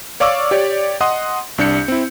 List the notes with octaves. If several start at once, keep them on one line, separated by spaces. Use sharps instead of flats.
C#5 D5 F5 C#6 D6 E6
G4 C#5 D5
D#5 F#5 C6 D#6
C2 D4 G6 C#7
C4 E4